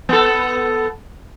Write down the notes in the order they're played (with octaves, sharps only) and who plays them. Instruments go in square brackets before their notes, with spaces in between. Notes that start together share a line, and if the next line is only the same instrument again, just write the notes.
[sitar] B3 A4